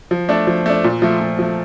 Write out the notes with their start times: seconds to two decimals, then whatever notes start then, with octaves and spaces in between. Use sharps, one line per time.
0.11 F3
0.29 A3 D4
0.47 F3
0.66 A3 D4
0.84 A#2
1.02 F3 A3
1.20 A#2
1.39 F3 A3